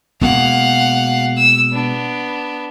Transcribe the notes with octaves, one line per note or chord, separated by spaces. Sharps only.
B2 G#3 A#3 F5 F#5
E6
B3 D4